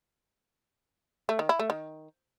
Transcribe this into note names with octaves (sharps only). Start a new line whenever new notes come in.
A3
D#3
E4
A3
D#3